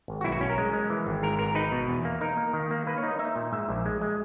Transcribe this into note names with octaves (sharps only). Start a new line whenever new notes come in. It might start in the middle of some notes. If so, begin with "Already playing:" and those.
G#1
F#4
B1 E4
F#4
C#4
A#4
G#3
G#3
E3
G#1
G#2 A#4
G#1 A#4
D#4 B4
B2
E2
A#3
D#4 A#4
A#3
D#3
A#3
A#3 B4
C#5
D#4 D#5
D#4 E5
A#2
G#2 E5
A#1
G#3
G#3